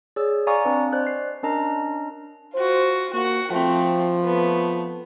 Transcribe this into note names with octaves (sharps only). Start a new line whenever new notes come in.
G#4 C#5 D5 E6
D5 F5 G#5 A#5 C#6 D#6
C4 D4 B4 F5
C5 D5 D#5 F#6
C7
C#4 D4 A#4 D#5 A#5
F4 F#4 C5
A#3 F#4 F#5
F3 A3 C4
A3 B3